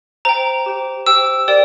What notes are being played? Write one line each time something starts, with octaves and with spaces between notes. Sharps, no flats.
C5 G5 A#5
G4 C5 G5
G4 C5 G5 E6
G4 A#4 D5 G5